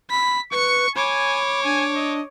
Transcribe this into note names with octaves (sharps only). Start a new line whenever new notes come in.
B5 B6
B4 C#6 C#7
C#5 G#5 B5 D6
D4 G#5
D#5